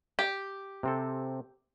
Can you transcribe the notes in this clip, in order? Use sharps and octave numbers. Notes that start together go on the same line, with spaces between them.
G4
C3 C4 A4